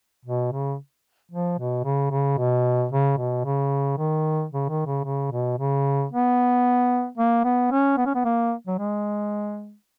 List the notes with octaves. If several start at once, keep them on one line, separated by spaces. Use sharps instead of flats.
B2
C#3
F3
B2
C#3
C#3
B2
C#3
B2
C#3
D#3
C#3
D#3
C#3
C#3
B2
C#3
B3
A#3
B3
C#4
B3
C#4
B3
A#3
F#3
G#3